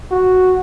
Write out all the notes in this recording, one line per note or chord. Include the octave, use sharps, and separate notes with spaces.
F#4